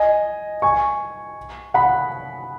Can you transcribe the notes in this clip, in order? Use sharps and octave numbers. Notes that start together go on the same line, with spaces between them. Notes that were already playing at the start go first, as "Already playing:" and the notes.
Already playing: D#5 G#5
G#5 C#6
F#5 B5